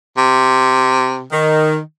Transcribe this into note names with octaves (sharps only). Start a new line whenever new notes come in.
C3
D#3